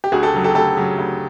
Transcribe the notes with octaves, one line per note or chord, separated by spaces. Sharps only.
G4
D2 F#4 G#4
G4 A4
C#3 F#3
G4 A4
D2 G4 A4
C#3 F#3
D2